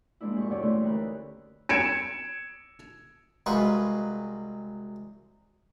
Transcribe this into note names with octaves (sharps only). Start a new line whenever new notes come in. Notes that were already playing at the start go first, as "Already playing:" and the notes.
F3 G#3 A#3 D4 E4
G2 A#2 C#6
E2 G2 B2 D3 C#5 D5
D2 D3 E3 A3 C#4 C6
G4 A#4 B4
D#4
G#6 C#7 D7 E7
C2 F#3 G#3 F4 B4 C#6